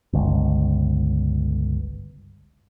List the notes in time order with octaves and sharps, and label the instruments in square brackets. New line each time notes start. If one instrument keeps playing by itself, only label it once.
[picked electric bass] G1 C#2